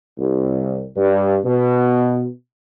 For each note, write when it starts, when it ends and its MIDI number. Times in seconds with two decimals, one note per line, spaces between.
0.18 0.86 36
0.96 1.38 43
1.44 2.27 47